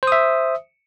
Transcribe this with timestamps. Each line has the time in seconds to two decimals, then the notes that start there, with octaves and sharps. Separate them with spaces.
0.03 C5
0.07 D#6
0.12 E5